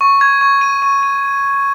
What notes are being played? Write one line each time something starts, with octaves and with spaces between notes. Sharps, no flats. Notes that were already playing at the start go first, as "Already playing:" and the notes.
C#6
G#6
C#6
D#7
C#6
D#7